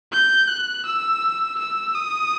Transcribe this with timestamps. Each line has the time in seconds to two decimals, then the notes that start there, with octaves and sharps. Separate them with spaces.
0.12 G6
0.48 F#6
0.86 E6
1.59 E6
1.95 D#6